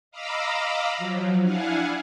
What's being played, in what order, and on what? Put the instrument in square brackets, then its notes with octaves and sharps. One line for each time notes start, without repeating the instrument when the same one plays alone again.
[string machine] D#5 F5 A#5 B5 D6 E6
F3 F#3
D4 E4 F5 F#5 G#5